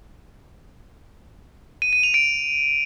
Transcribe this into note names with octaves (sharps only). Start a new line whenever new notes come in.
D#7
D#7
F7
D7